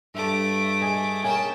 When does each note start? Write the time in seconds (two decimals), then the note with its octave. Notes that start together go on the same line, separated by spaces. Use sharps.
0.15 G2 A3 A4 E5 D6
0.81 G#4 D#5
1.23 A#3 C#4 G#4 G5 A5